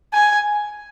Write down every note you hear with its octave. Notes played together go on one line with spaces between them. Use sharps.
G#5